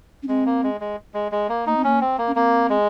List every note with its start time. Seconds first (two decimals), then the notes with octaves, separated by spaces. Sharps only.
0.23 C#4
0.28 G#3 C4
0.46 A#3
0.63 G#3
0.81 G#3
1.14 G#3
1.32 G#3
1.49 A#3
1.67 A#3 D#4
1.77 C4
1.84 A#3 C#4
2.01 C4
2.18 A#3
2.27 C#4
2.35 A#3 C4
2.70 G#3